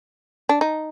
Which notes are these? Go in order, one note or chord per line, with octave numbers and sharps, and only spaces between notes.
D4
D#4